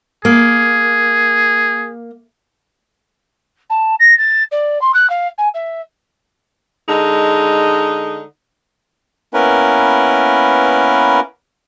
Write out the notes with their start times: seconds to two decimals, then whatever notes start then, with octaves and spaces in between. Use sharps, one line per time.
0.25 A#3 G#4
3.70 A5
4.00 A#6
4.18 A6
4.52 D5
4.82 C6
4.94 F#6
5.10 F5
5.38 G#5
5.54 E5
6.89 D3 G#3 D#4
9.34 A#3 B3 C#4 E4 A#4 B4